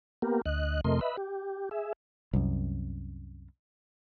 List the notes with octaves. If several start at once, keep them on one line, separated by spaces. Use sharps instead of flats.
A#3 B3 G4 A#4
D2 D#5 F#6
F2 C3 A3 A#4 D#5 C6
B4 D#5 E5 B5
G4
G#4 E5
C2 F#2